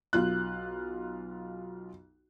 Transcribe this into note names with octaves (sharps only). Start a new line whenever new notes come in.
B1 F4 F#6